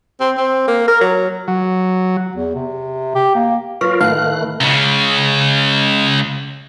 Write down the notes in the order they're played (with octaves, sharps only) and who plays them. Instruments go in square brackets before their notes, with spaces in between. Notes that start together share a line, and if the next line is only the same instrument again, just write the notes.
[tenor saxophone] C4
C4
A#3
A#4
F#3
[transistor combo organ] F#3
[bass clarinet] E2
C3
G4
A#3
[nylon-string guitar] F#3 [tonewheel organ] F4 A#4 [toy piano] B4 F5 C#6
[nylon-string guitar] A2 [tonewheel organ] D#3 A3 F#6 [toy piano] D#4 F#5 [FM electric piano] F5
[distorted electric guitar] C#2 C#3